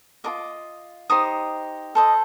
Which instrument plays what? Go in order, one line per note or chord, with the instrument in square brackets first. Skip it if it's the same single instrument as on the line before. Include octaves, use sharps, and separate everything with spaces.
[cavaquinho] F4 A#4 D#5 D6
D#4 G4 C5 D#6
A4 C5 D#5